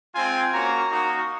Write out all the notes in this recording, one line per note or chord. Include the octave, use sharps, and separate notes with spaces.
G#3 C4 F4 G#5
A#3 C#4 F#4 A#5
A#3 D#4 F#4